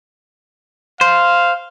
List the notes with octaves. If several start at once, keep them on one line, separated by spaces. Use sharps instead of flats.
C5 F5